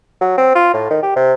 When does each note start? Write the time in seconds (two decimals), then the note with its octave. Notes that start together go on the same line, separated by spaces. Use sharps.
0.21 F#3
0.37 C4
0.55 F4
0.74 A2
0.90 D#3
1.03 G4
1.16 C3